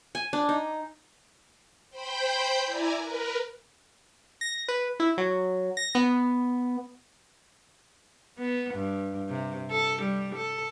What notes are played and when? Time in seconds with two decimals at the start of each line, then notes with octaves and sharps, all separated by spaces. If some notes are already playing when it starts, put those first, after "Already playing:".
0.15 G#5
0.33 D4
0.49 D#4
1.90 C5 G5 B5 G6
2.65 E4 D5 G#5 A#5
2.97 A#4 B4
4.41 A#6
4.68 B4
5.00 E4
5.18 F#3
5.77 A#6
5.95 B3
8.38 B3
8.74 G2
9.29 C3
9.71 A4
10.02 G3
10.35 A4